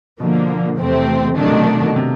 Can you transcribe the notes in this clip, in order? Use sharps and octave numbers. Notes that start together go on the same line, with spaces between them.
B2 D3 F3 A#3
E2 C3 E3 A3 C4
C3 D#3 F#3 A3 D4
B2
B2
B2
C3